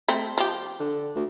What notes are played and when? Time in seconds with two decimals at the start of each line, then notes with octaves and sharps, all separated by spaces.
0.08 A3 C4
0.38 F3 G4
0.80 D3
1.15 D2